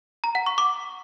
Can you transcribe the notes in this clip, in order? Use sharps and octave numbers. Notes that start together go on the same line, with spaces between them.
A#5
F#5
C#6
D6